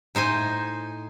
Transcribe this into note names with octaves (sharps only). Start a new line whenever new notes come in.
A2 D#4 C5 G#5